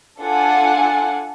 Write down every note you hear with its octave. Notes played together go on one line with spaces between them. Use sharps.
D4 F4 A4 F#5 G#5